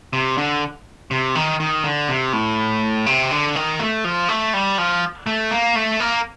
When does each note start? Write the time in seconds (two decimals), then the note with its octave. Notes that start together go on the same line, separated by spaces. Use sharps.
0.13 C3
0.38 D3
1.11 C3
1.35 D#3
1.60 D#3
1.84 D3
2.08 C3
2.33 A2
3.06 C3
3.31 D3
3.55 D#3
3.80 A3
4.04 F3
4.29 A3
4.54 G3
4.78 F3
5.27 A3
5.51 A#3
5.75 A3
6.00 A#3